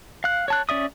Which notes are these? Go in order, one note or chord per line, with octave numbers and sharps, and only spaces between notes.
F5 F#6
C#5 A5 F#6
C#4 D5 E5 D#6